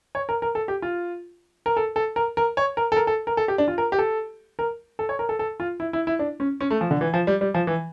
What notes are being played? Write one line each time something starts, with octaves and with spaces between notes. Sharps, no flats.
C#5
A#4
A#4
A4
G4
F4
A#4
A4
A4
A#4
A#4
C#5
A#4
A4
A#4
A4
A#4
A4
G4
D4
F4
A#4
G4
A4
A#4
A4
C#5
A#4
A4
A4
F4
E4
E4
E4
D4
C#4
C#4
A3
F3
D3
E3
F3
G3
G3
F3
E3